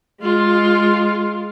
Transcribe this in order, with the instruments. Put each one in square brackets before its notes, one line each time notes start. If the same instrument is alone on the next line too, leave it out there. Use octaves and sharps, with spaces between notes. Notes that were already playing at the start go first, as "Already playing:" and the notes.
[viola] G#3 F4